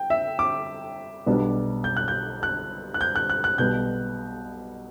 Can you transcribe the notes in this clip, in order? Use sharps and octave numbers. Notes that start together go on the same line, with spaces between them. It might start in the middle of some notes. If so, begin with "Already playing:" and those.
Already playing: G5
E5
D6
B1 B2 G3 B3 D4
G6
F#6
G6
F#6
F#6
G6
F#6
F#6
F#6
B1 B2 G3 B3 G6